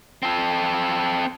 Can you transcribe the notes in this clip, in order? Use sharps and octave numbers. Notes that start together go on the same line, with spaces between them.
C4 A4